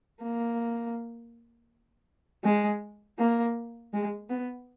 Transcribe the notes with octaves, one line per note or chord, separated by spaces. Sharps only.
A#3
G#3
A#3
G#3
B3